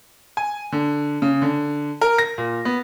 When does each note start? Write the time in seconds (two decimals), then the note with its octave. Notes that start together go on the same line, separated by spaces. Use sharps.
0.37 G#5
0.72 D3
1.22 C#3
1.42 D3
2.01 A#4
2.18 A#6
2.38 A#2
2.65 B3